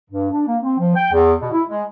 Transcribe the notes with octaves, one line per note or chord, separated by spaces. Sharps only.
G2
D4
A#3
C4
F3
G5
E2
B2
E4
G#3